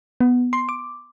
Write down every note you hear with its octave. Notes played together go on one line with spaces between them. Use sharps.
B3
C6
D6